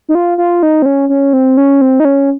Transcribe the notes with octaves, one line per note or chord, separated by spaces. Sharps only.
D#4
F4
F4
D#4
C4
C#4
C#4
C4
C#4
C4
D#4
C#4